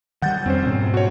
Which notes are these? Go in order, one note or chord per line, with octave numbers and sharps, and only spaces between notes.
D#3 G3 F#5 G6 A6
F2 F#3 G3 C4 C#4 C5
G#2 B2
F#4 C#5